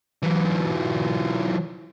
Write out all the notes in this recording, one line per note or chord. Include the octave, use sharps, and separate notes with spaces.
E3 F#3